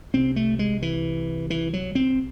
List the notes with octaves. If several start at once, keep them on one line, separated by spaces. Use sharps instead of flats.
C2 C3 C4
A3
G#3
E3
E3
F#3
C4